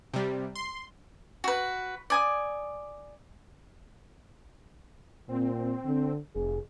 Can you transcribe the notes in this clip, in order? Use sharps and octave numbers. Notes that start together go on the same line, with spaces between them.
C3 G3
C6
F#4 B4
D5 G#5 D#6
A#2 C4
D3
F1 G#4